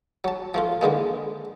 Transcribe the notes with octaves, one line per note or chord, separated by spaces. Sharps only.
F#3 A5
F3 A3 F4
D3 E3 G#3 A#3